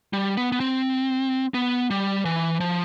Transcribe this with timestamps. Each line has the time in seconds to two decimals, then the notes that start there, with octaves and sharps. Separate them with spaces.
0.13 G3
0.37 B3
0.52 B3
0.60 C4
1.54 B3
1.90 G3
2.25 E3
2.60 F3